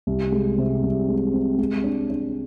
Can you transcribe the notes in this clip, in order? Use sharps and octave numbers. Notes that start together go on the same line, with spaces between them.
C2
G#3
C3
C2
G#3
C4
G#3
D4
D4